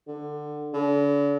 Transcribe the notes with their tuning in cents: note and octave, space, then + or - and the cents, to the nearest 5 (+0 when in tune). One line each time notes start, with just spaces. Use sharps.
D3 +20
D3 -40